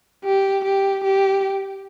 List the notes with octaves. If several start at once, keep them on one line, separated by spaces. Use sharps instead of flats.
G4
G4
G4